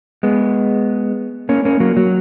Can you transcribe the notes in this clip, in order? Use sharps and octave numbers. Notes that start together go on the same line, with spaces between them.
G#3 B3
A#3 C#4
A#3 C#4
F#3 A#3
F#3